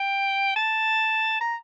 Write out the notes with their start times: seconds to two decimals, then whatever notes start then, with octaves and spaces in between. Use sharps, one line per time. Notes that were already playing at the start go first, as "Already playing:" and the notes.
Already playing: G5
0.56 A5
1.41 A#5